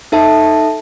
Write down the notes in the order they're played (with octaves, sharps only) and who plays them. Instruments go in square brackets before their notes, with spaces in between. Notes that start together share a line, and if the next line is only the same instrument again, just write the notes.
[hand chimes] D#4 A4 E5 A5